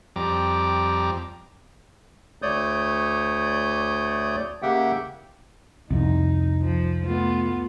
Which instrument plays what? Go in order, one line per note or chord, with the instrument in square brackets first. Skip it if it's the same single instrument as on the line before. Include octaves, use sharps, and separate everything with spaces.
[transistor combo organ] F2 G3 A#5 D6
[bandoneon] D2 A3 C#5 D5 D#6 G6
C#3 A#3 G4 E5 F#5 G5
[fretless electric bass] C2 F2 [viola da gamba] D#4
[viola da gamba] F3
A3 B3 F4